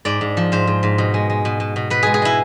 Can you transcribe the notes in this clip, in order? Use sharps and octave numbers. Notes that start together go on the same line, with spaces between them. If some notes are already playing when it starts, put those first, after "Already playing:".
G#2 D5
G#2
F3
G#2 C5
G#2
G#2
B2
G#3
G#3
B2
B2
B2
B2 B4
G#3 G#4
G#4
G#3 E4